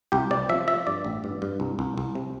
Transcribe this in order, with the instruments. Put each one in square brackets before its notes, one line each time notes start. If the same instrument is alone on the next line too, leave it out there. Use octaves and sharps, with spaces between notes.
[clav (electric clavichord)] C2 G4
C3 D5
F3 E5
F3 E5
G2 D5
A1
G2
G2
C2
C2
C2
C3